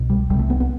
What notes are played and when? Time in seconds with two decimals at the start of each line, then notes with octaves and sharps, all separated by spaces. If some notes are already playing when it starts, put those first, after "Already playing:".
Already playing: C2 B2
0.10 G3
0.30 C2 C3 G3
0.39 A3
0.50 B3
0.60 B3